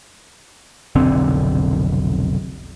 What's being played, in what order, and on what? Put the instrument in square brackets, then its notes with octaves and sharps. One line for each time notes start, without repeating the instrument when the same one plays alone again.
[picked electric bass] F1 B1 D3 C4